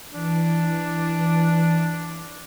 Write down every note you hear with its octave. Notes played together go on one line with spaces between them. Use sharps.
E3 D4